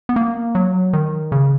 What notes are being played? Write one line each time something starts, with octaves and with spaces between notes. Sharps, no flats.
B3
A#3
F#3
D#3
C#3